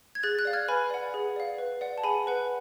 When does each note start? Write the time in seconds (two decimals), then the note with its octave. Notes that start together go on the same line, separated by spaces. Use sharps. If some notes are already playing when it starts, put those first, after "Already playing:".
0.15 G#6
0.23 G#4 F#6 A6
0.39 F#6 A6
0.45 D5 F5
0.53 F6 G#6
0.68 B4 G#5 B5
0.90 D5 F#5
1.14 G#4
1.36 D5 F5
1.58 B4
1.81 D5 F#5
1.98 A5
2.04 G#4 G#5 B5
2.27 B4 F#5